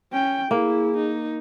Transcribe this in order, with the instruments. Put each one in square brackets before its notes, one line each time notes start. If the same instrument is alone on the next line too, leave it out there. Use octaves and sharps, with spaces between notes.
[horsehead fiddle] C#4 G5
[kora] A#3 [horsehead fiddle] E4 [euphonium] G#4
[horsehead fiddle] D#4